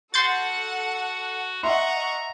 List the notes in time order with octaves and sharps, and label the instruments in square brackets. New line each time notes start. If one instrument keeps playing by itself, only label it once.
[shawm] F#4 [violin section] A4 F#5 [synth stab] C6 G6 A6
[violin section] D#5 F#5 C#6 [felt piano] E5 C6 [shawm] A#5